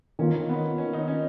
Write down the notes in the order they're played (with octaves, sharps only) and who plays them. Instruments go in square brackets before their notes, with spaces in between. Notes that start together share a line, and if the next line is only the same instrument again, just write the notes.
[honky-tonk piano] D#3 A#3 F4 [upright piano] C#4
[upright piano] B3
C#4
D#4
C#4